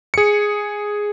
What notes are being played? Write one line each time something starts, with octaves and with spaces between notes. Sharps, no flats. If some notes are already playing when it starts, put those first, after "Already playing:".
G#4 C#7